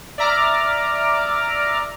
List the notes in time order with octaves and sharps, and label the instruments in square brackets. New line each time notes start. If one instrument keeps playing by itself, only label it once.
[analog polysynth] D5 E5 A#5 D6 F6